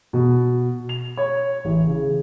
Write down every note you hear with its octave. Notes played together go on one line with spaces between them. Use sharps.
B2
F7
C#5
A1
C#3